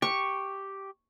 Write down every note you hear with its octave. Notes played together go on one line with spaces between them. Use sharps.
G4 C#6